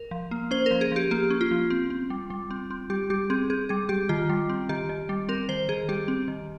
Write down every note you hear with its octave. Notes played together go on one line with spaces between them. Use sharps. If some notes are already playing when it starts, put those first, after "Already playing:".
Already playing: A#4
F3
A#3
C#4 C5
F3 A#4
G#4
F3 G4
A#3 G4
C#4
F4
F3
C4
C4
G3
G3
C4
C4
G3 G4
G3 G4
C4 G#4
C4 G#4
G3 G#4
G3 G4
D#3 F4
G3
C4
D#3 G4
D#3
G3
C4 A#4
D#3 C5
D#3 G#4
G3 G4
C4
D#3